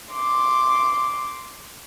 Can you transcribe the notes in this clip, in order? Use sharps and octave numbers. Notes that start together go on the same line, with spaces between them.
C6 D6